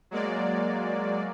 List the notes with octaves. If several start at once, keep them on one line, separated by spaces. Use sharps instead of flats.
F#3 G#3 A#3 D5